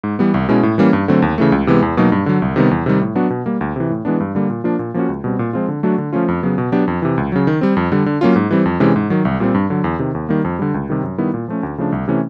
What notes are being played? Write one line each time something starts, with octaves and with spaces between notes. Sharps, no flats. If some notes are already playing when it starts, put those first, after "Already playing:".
G#2
E3 G3 B3
C2
B2 G#3 C#4 E4
A2
E3 G3 A#3 C#4
G2
D3 F#3 A3 C4
D#2
C#3 E3 A3
C#2
C3 E3 G#3 B3
E2
B2 F#3 A#3 D#4
G2
D3 F#3
C2
C3 D#3 G3 B3
E2
C3 D#3 G3
A2
F#3 B3 D4 F#4
B2
G3 A#3
D2
C3 E3
A2
E3 G#3 B3 D4
G2
D3 G3 A#3
A#2
F3 A#3 D4 F4
A#2
F3 A#3 C#4 F#4
C#2
B2 G3 C4
A#2
F3 G#3 C4 F4
D3
F#3 A3 D4 F#4
D3
F3 A3 C#4 F4
F2
C#3 F#3 B3
B2
F#3 B3 D4 G4
F2
C3 E3
C#2
C#3 F#3
D#3
G3 C4
F2
D3 G3
D3
F#3 A#3 C#4 F4
G#2
E3 G3 C4
F2
C3 E3 G#3 C#4
G#2
D#3 F#3
C2
A#2 G3 C4
G2
D3 F#3
E2
C3 D#3
D#2
D#3 G3 A#3
F2
D3 G3
C#2
C3 D#3 G3
F#2
D#3 G3 B3 E4
A#2
F3 A3 C#4
D2
C#3 F3 A3 D4
C2
C3 E3 A3 C#4